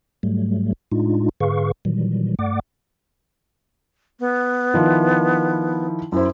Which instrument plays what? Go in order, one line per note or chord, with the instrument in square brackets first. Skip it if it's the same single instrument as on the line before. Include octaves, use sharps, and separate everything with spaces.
[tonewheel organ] G#2 F#3 G3 A3
A2 G#3 D4 D#4 F4
G#2 D3 G#4 B4 F5 C#6
A#2 D#3 E3 F#3 G3
G2 A3 D5 F#5 D6
[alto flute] B3
[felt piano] D#3 F3 E4
[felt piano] F#2 C5 [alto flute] E4